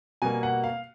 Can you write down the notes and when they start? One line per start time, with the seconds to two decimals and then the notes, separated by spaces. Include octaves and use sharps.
0.22 B2 G3 A#3 G#5
0.43 F#5
0.64 F5